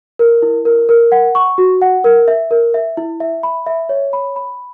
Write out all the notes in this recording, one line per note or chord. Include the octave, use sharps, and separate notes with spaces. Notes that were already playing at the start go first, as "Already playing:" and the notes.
A#4
E4
A#4
A#4
F#5
C#6
F#4
F#5
A#4
E5
A#4
E5
E4
E5
B5
E5
C#5
B5
B5